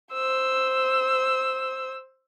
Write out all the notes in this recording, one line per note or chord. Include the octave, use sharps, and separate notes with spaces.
C5 E6